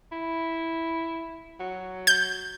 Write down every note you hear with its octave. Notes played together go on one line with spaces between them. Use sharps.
E4
F#3
G6